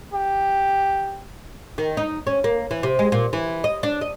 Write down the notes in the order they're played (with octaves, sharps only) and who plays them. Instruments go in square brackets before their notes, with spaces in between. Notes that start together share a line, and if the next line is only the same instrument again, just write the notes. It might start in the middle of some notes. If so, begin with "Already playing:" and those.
[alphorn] G4
[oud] D#3
D#4
C#4
A#3
E3
C3
G#3
A#2
E3
D#5
D4
D#5